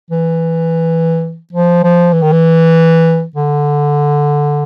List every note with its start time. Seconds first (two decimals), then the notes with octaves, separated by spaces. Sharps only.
0.11 E3
1.53 F3
1.84 F3
2.13 E3
2.22 D#3
2.32 E3
3.36 D3